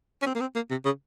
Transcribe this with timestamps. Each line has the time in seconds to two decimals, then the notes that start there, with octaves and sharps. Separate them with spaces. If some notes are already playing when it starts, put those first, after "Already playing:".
0.22 C#4
0.26 C4
0.35 A#3
0.41 C4
0.55 A#3
0.70 C3
0.85 C#3